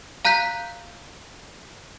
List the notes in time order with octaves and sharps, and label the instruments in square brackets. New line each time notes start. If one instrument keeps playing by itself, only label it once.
[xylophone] F5 A#5 F#6 G6 B6